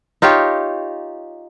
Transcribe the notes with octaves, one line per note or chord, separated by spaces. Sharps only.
D#4 F4 G4 C#5